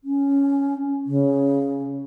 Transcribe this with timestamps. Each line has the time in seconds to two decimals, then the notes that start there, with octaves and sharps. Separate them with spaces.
0.04 C#4
1.06 C#3